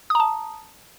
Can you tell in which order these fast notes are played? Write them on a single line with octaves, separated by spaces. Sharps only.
D#6 A#5 A5